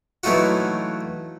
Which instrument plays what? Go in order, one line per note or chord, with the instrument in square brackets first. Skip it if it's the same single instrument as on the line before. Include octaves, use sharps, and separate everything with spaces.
[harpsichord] E3 F#3 A3 D#4 F4 F#4